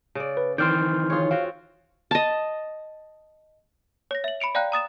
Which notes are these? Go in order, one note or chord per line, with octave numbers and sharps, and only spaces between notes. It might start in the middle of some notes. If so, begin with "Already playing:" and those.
C#3 D5
B4
D#3 E3 C4 D5 C6 F6 G6
F4 G#4 C#5
C4 F4 F#4 F5
D#5 A5
C#5 A#6
E5 F#7
B5 C#7 D7 F7
D5 F5 G5 A#5 F#6
A#5 D#6 A6 E7